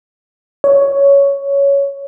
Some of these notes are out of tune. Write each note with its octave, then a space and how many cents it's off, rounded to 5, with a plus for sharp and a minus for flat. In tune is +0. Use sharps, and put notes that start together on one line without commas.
C#5 +10